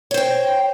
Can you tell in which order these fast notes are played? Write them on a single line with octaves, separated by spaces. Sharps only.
C#5 C5 G5